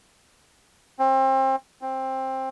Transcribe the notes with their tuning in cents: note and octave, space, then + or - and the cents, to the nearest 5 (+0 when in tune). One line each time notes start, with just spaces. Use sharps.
C4 +30
C4 +15